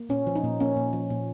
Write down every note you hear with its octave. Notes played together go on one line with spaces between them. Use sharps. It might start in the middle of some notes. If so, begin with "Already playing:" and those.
Already playing: A#3
A#2 C#4
F3
D#4
A#2
A#3 C#4
A#2
F3
A#2